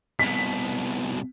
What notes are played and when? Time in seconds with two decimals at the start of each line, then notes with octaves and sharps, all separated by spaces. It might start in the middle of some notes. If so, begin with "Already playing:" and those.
0.19 C2 B2 B6